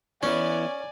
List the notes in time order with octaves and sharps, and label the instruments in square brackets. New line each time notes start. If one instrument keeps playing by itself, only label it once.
[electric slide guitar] E3 B3 E4 [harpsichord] C#4 [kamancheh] D5 G#5